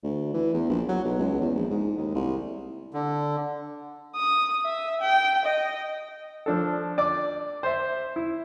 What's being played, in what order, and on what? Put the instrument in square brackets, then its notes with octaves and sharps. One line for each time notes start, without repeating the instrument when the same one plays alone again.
[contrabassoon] D2
E3
E2
A#1
F#3
B1
C#2
E2
A#1
G#2
D#2
C2
[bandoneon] D3
[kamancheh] D#6
E5
G5
D#5
[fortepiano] F3 D4 A4
D5 D6
C5 E5
E4